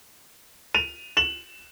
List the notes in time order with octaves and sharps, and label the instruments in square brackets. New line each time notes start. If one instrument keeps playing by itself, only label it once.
[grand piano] D#7 F7
E7 F#7